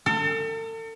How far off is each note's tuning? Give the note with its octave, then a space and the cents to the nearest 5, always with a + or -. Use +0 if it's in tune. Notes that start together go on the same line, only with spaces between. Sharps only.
A4 +40